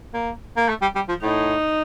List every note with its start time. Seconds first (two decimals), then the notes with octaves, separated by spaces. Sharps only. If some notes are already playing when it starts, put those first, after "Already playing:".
0.14 A#3
0.57 A#3
0.69 A3
0.82 G3
0.96 G3
1.09 F3
1.22 A2 D#4